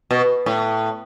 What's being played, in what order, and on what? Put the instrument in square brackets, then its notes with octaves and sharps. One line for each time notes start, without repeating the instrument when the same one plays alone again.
[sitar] B2
A2